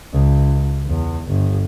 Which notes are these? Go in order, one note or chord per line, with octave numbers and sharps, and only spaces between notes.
C#2
E2
G1